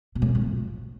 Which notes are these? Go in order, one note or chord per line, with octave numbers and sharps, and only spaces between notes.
B2
A2
G#2
D#3
F3